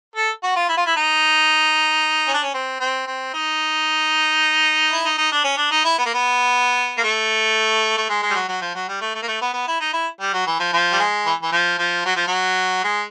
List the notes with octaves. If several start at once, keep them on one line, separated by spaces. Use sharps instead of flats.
A4
F#4
F4
E4
F4
E4
D#4
C#4
D4
C#4
C4
C4
C4
D#4
E4
D#4
D#4
D4
C#4
D4
D#4
E4
B3
A#3
B3
A#3
A3
A3
G#3
G#3
G3
F#3
F#3
F3
F#3
G3
A3
A3
A#3
A3
B3
B3
E4
D#4
E4
G3
F#3
E3
F3
F3
G3
G#3
E3
E3
F3
F3
F#3
F3
F#3
G#3